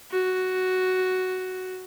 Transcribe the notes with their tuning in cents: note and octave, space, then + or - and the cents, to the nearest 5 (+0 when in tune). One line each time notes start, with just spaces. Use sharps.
F#4 +5